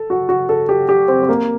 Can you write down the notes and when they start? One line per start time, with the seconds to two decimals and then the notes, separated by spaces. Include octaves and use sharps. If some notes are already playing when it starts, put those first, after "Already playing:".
Already playing: A4
0.10 F#4
0.29 F#4
0.49 A4
0.69 G4
0.89 G4
1.08 C4
1.23 C4
1.29 A#3